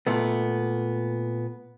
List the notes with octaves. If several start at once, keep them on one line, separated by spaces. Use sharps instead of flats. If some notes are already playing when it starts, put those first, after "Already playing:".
A#2 A3 B3